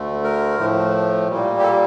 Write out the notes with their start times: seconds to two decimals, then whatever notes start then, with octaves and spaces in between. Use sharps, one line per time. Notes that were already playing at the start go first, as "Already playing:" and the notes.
Already playing: D2 D3 A3
0.24 A#4
0.59 A2 F3 A3
1.28 A#2 G3 A#3
1.59 G4
1.63 A4